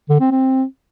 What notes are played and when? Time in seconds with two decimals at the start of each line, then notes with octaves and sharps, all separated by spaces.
0.09 D3
0.20 C4
0.31 C4